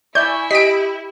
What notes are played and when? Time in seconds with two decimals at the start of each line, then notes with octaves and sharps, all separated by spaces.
0.15 E4 D5 E5 G#5 C#6 G6
0.51 G4 D#5 B6 D7